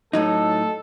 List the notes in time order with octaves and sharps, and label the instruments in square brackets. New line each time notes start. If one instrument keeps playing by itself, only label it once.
[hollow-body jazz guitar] A2 F#3 D#4 [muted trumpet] A4